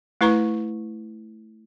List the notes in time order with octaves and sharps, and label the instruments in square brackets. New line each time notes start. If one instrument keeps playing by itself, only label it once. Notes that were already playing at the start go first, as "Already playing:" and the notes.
[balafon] A3 E4 B4 A#5 C#6